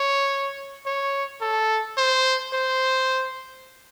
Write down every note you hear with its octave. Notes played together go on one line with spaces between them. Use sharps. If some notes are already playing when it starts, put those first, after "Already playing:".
Already playing: C#5
C#5
A4
C5
C5